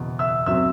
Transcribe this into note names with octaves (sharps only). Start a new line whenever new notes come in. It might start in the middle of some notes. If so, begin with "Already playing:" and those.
Already playing: F#1 E2 B2
E5 E6
F#2 F#3 C4 E5 E6